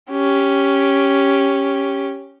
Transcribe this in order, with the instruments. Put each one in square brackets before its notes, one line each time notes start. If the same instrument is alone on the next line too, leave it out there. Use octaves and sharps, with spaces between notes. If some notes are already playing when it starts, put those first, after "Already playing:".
[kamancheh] C#4 G4